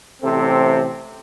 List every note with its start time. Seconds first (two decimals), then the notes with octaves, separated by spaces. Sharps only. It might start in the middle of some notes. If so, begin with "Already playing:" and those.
0.22 A1 C3 C4 A4